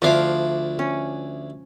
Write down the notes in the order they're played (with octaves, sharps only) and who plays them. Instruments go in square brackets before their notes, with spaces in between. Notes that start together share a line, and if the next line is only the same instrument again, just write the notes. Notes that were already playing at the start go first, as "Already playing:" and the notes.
[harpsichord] D2 D4 E4 [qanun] F3 F5 D6
[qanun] C#4